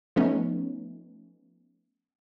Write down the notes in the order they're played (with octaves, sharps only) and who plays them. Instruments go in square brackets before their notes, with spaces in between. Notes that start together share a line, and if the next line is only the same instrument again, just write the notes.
[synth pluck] F3 A3 B3 C#4 D#4